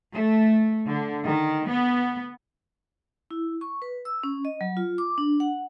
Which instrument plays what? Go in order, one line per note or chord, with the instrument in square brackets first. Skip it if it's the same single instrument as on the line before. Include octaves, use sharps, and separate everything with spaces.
[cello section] A3
D3
D#3
B3
[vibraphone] E4
C#6
B4
E6
C#4
D#5
F#3
F4
D6
D4
F#5